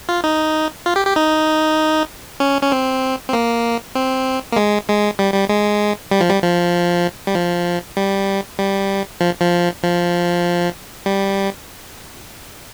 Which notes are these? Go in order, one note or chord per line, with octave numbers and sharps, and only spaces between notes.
F4
D#4
F4
G4
G4
D#4
C#4
C#4
C4
C4
A#3
C4
A#3
G#3
G#3
G3
G3
G#3
G3
F3
G3
F3
G3
F3
G3
G3
F3
F3
F3
G3